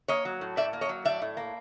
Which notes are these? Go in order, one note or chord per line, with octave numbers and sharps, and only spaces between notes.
A#3 C#5 D#5
F#3
A2
A2 D5 E5
A#3
C#5 D#5
F#3
A2 D5 E5
A2
A#3